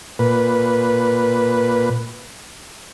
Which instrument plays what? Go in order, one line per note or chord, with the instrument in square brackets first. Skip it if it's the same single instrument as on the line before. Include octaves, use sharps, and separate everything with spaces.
[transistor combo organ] A#2 B4